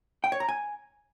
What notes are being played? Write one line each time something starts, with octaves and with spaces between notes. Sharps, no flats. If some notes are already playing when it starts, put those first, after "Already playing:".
G5
C#5
A#5
G#5